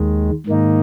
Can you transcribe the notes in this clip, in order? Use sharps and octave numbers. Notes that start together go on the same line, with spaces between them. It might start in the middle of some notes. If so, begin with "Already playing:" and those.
Already playing: D#2 D#3 G#3
G#2 D#3 A#3 D#4